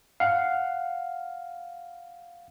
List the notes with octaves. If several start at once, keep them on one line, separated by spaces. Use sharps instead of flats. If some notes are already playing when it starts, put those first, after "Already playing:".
F5 F#5